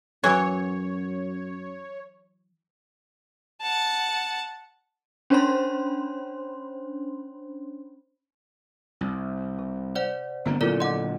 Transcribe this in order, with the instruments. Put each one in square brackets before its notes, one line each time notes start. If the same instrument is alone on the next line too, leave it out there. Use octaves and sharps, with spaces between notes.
[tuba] F#2 [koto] E3 F#3 [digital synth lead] C#5
[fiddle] F#5 A5
[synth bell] C#4 D4 C5 C#5 B5 C6
[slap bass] C2
[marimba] C3
[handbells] C5 D5 F#5
[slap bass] G1 D3 A#3 [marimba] B3 A#5
[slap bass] A#2 D3 F#3 [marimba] E4 A#4 [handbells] F4 A4 D5
[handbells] D#5 F#5 [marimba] C6 D6